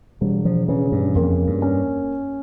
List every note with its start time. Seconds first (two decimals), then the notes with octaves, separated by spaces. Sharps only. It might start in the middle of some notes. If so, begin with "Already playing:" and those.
0.21 E1 G3
0.45 F3
0.68 C#3 E3
0.92 G2
1.15 F2 A#3
1.47 G2
1.62 C#4